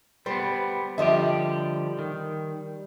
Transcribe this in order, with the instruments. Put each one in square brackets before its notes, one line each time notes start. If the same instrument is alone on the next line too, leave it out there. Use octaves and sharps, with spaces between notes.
[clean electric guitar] G3 B3 [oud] C5
[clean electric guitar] D3 F3 G4 [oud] G3 D#5 E5
[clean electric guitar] D#3